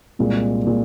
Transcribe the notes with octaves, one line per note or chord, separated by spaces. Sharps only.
C2 A#2 G#3
A#2 G#3